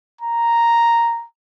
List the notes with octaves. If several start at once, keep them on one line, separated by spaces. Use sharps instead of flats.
A#5